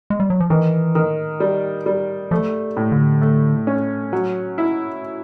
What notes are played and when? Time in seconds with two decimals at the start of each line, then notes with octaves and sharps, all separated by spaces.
0.10 G#3
0.20 G3
0.30 F#3
0.40 F3
0.50 D#3 E3
0.95 D#3
1.40 G3
1.86 G3
2.31 F3 A3
2.77 A2
2.92 D3
3.22 A3
3.67 C#4
4.13 F#3
4.58 E4